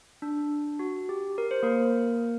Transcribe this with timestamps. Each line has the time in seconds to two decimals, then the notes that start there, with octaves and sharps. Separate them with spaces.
0.22 D4
0.79 F#4
1.09 G4
1.38 A#4
1.51 C5
1.63 A#3 A#4